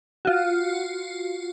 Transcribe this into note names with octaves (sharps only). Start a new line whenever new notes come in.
F4 F#4